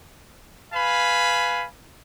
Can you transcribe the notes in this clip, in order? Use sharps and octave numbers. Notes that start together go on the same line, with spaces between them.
B4 F5 G#5 B5